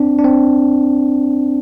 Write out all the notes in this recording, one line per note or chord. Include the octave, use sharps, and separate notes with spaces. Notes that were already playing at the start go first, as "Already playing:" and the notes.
Already playing: C4 D4
D4
C4